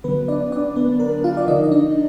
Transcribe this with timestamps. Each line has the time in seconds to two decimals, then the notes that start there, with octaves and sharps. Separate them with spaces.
0.04 D3 F#3 B3 B4
0.28 D4 D5
0.52 D4 D5
0.76 B3 B4
1.00 A#4
1.24 F4 F5
1.37 D5
1.47 D3 F3 D#4 D#5
1.63 D#5
1.72 D4 D5